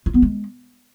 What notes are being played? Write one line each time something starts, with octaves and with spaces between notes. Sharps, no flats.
F4
B3
G#3